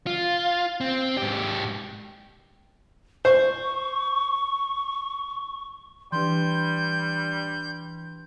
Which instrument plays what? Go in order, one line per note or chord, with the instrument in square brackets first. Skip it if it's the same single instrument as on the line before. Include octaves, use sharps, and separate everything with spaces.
[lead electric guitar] F4
C4
G#2 G4
[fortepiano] C5 [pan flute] C#6
[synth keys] E3 D4 [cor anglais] G3 [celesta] G4 B4 C6 [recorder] G6